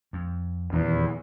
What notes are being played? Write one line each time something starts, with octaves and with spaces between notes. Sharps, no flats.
F2
D#1 E2